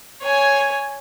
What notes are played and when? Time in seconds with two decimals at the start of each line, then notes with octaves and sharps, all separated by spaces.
0.22 C#5 G#5